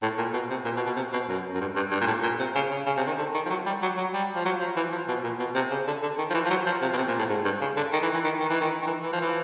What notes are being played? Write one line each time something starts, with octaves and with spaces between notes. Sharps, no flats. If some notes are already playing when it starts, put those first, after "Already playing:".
A2
A#2
B2
C3
A#2
B2
B2
C3
B2
F#2
F#2
G2
G2
G2
A#2
A2
A#2
C3
C#3
C#3
C#3
C3
D#3
D3
D#3
F3
F#3
G3
F#3
F#3
G3
F3
F#3
F3
E3
F3
B2
A#2
B2
C3
C#3
D3
D3
D#3
F3
E3
F3
F#3
F3
C3
B2
C3
A#2
A2
G#2
G2
C#3
D3
D#3
E3
E3
D#3
D#3
E3
D#3
D#3
E3
E3
F3
E3